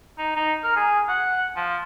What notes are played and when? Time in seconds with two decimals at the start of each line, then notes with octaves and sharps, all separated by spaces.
0.19 D#4
0.36 D#4
0.64 A#4
0.77 G#4
1.09 F#5
1.56 F3